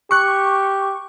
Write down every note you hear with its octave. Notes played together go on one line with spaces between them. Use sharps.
G4 C#6 F#6 C#7